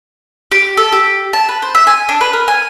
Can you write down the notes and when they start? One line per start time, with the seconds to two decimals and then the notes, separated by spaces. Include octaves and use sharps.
0.52 G4
0.77 A4
0.92 G4
1.33 A5
1.49 B4
1.62 C5
1.75 E5
1.87 G#5
2.09 D4
2.21 B4
2.33 A#4
2.48 G#5